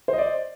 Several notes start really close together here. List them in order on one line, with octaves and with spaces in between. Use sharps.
C5 D#5 D5